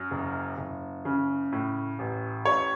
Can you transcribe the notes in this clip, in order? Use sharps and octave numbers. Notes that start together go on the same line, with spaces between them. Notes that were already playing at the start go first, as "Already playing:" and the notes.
Already playing: F#2
F#1
F#1
C#3
A2
A1
A1 C#5